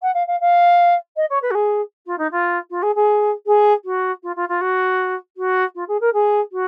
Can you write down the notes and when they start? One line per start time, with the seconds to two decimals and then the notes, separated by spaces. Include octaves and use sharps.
0.02 F#5
0.14 F5
0.27 F5
0.40 F5
1.16 D#5
1.29 C#5
1.42 B4
1.51 F#4
1.54 G#4
2.06 F4
2.18 D#4
2.31 F4
2.70 F4
2.82 G#4
2.95 G#4
3.46 G#4
3.84 F#4
4.23 F4
4.36 F4
4.48 F4
4.61 F#4
5.37 F#4
5.75 F4
5.88 G#4
6.00 A#4
6.13 G#4
6.52 F#4